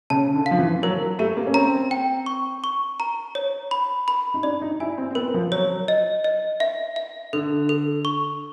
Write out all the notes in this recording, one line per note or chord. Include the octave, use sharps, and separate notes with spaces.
C#3 A5
D3
F5
F3
E3
F#3 A#4
A3 G4
A#3
C#4
C4 A#5
G5
C#6
C#6
A#5
C#5
B5
B5
D#4
D4 D5
D#4
E4 G#5
C4
C4
B3 A#4
F3
F#3 C#5
D#5
D#5
E5
E5
D3 A4
A4
C#6